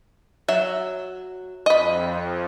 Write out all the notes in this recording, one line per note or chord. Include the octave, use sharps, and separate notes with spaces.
F#3 E5
F2 D#5 B5